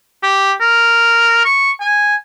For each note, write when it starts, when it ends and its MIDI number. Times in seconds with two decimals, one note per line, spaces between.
0.23 0.53 67
0.61 1.43 70
1.45 1.72 85
1.81 2.15 80